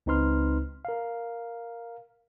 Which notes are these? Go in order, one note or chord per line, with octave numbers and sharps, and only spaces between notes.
C#2 C4 D#4 B4 C6 F6
A#4 F5